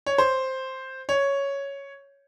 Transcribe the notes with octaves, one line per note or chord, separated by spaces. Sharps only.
C#5
C5
C#5